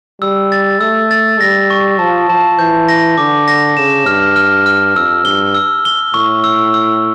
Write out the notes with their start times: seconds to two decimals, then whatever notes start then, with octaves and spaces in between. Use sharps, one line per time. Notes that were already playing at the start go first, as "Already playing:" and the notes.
0.21 G3 E6
0.52 A6
0.81 A3 E6
1.11 A6
1.40 G3 A#6
1.70 C#6
1.99 F3 A5
2.29 F3 A5
2.59 E3 G6
2.88 A#6
3.17 D3 D6
3.48 A#6
3.77 C#3 E7
4.06 G2 F6
4.36 F6
4.66 F6
4.95 F2 E6
5.25 G2 G7
5.55 E6
5.85 G7
6.14 A2 C#6
6.44 E6
6.74 E6